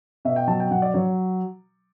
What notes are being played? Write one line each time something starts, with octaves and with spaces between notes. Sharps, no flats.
B2 E5
G5
F#3 A5
G5
F#3 F#5
D5
F#3 C#5